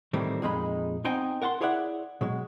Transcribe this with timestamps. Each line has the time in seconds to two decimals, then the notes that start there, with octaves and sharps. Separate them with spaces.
0.13 A2 D#3 E3 G3 A3 C4
0.42 F2 A#2 G#3 D#4 B5
1.04 B3 C4 D#4 G5 G#5 A#5
1.42 A#4 F#5 A5 B5 C6
1.61 E4 G#4 C#5 D5 E5 F#5
2.21 B2 F#3 G#3